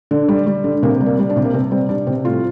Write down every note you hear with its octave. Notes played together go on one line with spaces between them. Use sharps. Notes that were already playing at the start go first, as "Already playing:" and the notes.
D3
G3
G3
D3
C3 A#3
G3
A#3
G3
D4
C3
A#3
C3 C4
G3 C4
G3 D4
C3 C4
A2 F4